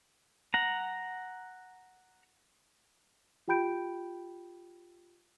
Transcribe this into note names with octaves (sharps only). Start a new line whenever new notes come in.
F#5 A#5
F4 G4 G5 B5 G6 D7